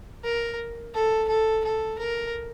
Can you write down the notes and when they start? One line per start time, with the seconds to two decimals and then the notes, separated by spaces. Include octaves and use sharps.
0.24 A#4
0.95 A4
1.29 A4
1.65 A4
1.99 A#4